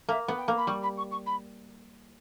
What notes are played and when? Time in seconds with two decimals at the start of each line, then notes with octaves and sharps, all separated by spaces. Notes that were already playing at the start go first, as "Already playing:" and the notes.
0.09 A#3 E5
0.28 B3
0.38 G5
0.48 A#3
0.58 B5
0.67 G3 C#6
0.83 B5
0.97 C#6
1.11 C#6
1.26 B5